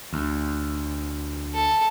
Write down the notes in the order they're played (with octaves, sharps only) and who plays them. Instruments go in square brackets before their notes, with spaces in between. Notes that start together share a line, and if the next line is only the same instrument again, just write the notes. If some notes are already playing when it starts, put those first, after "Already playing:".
[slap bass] D2
[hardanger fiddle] A4